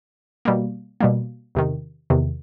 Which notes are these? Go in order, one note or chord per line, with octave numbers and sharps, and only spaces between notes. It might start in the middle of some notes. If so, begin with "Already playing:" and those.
B2 G3 A#3
B2 G3 A#3
E2 C3 D#3
E2 C3 D#3